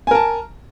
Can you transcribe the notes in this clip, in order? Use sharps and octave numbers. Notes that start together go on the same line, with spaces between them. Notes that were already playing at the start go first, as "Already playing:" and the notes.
A#4 G#5 A5